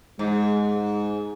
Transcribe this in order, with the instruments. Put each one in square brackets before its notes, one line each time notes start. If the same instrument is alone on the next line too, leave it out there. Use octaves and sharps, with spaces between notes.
[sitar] G#2 [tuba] G#3